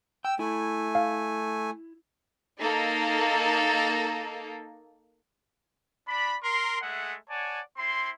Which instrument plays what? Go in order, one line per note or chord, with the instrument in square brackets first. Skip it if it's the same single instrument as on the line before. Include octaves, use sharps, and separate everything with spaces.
[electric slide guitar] G5 [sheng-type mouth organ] E6
[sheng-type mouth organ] A3 G#5 [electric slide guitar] E4
[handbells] F5
[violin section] A#3 D#4 A4
[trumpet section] D4 D5 B5
A#4 C6
G#3 A3 G#4 E5 F#5
C#5 D5 F#5 G#5 A5
C4 E4 C6